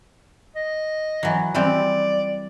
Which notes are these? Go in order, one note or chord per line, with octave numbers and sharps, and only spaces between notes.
D#5
E3 F#3
E3 G3 C4 D5